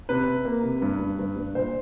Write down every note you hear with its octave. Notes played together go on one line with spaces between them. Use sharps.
C3 B4
C3
A#3
C3
G2
G2
G2
G2
A#2 C5